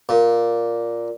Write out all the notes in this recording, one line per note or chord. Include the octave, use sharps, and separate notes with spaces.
A#2